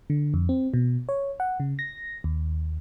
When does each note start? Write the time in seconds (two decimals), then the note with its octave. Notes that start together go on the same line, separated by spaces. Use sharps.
0.10 D3
0.34 F2
0.49 C4
0.74 B2
1.09 C#5
1.40 F#5
1.60 C#3
1.79 A#6
2.24 D#2